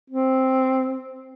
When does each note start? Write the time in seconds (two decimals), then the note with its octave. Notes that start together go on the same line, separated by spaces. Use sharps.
0.10 C4